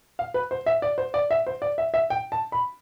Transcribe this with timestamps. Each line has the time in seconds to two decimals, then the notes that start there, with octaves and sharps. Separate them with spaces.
0.19 F5
0.34 B4
0.51 C5
0.66 E5
0.82 D5
0.98 C5
1.14 D5
1.31 E5
1.47 C5
1.62 D5
1.78 E5
1.94 E5
2.10 G5
2.32 A5
2.52 B5